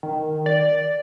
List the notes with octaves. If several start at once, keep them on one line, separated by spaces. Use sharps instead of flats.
D#3
D5